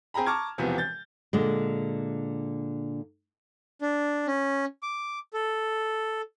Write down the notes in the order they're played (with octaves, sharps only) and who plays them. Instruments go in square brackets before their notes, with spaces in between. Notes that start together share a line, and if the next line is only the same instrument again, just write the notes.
[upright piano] C4 G#4 G5 A#5 B5
A5 A#5 C#6 D6 F6 G#6
E1 C3 E3 F3 B3 F#4
G6 A6
[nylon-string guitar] A#2 D3 G#3
[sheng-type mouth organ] D4
C#4
D6
A4